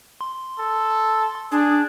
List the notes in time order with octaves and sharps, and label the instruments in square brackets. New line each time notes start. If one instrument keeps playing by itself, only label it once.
[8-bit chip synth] C6
[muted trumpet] A4
[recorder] D4 [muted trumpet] G#4